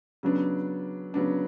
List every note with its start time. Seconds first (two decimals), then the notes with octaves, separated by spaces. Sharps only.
0.23 C#3 F#3 B3 D4
1.14 C#3 F#3 B3 D4